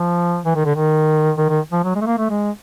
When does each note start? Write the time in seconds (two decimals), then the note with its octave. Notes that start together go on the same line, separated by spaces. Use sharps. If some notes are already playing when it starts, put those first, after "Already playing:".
Already playing: F3
0.45 E3
0.55 D#3
0.65 D3
0.75 D#3
1.37 D#3
1.49 D#3
1.72 F3
1.84 F#3
1.95 G#3
2.01 A3
2.07 A#3
2.18 A3
2.30 G#3